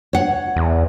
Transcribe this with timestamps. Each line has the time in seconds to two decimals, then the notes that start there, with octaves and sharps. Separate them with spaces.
0.13 C#5 F#5
0.56 E2